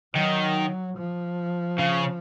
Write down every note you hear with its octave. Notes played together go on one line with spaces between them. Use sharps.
D#3 F#3
F3
C#3